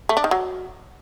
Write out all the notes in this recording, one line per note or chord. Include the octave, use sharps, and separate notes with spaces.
A3
D4
D#3
F#3